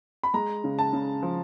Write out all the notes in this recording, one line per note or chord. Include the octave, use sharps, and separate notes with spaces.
B5
G#3 A#5
C#3
A5
C#3
F3